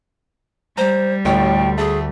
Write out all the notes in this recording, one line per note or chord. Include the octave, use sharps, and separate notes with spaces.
G3 C5 A#5
A1 D2 A2 C#5 G5
A3 G#4